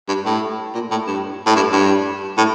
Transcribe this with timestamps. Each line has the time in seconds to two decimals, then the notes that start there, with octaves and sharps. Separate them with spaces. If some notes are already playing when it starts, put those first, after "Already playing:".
0.08 G2
0.26 A2
0.74 A#2
0.91 A2
1.07 G2
1.46 A2
1.56 G2
1.72 G2
2.38 A2